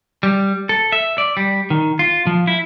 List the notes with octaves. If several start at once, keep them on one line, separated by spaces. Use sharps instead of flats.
G3
A4
E5
D5
G3
D#3
F4
F3
E4